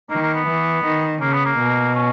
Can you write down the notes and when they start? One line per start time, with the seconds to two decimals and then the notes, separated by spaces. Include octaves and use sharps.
0.10 D#3 A#3
0.22 A#3
0.35 B3
0.47 E3
0.85 D#3
1.21 C#3 A#3
1.33 B3
1.45 A#3
1.58 B2
1.95 C#4